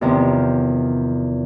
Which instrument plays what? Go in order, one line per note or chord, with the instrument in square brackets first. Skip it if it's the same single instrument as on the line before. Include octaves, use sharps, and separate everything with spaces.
[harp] E2 C3 D#3 F3